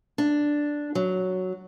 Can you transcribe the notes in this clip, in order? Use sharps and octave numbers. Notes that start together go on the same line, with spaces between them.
D4
F#3